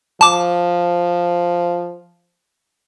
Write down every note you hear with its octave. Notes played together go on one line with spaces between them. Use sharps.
F3 A5 D6